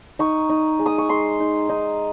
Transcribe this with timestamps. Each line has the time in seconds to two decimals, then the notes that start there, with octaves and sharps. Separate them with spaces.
0.19 D#4 C#6
0.50 D#4
0.79 G#3
0.86 D#6
0.98 C#6
1.09 G#3 C6
1.40 D#4
1.69 D#4